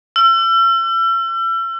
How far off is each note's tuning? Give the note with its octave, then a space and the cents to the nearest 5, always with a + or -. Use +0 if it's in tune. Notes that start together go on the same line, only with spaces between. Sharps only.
E6 +40